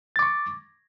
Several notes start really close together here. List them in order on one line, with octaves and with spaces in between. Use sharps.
A6 D6 C#6